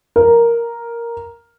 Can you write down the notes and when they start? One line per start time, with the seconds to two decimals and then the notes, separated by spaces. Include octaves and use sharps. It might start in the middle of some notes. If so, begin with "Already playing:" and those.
0.16 A#4